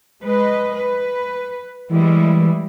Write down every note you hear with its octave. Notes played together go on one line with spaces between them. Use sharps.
G#3 B4 D#5
B4
E3 G3 G#3 E4